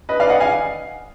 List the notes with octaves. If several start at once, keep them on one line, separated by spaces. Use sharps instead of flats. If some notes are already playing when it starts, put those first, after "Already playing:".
B4 D#5
D5 F5
D#5 F#5
F5 G#5